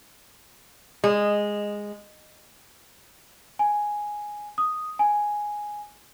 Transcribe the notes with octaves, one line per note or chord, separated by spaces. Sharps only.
G#3
G#5
D#6
G#5